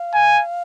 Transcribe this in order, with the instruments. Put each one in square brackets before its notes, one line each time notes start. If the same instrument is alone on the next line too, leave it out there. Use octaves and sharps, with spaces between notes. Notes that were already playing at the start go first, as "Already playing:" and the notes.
Already playing: [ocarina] F5
[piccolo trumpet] G#5